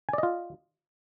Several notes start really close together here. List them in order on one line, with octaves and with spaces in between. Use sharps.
G#5 D5 D#5 F4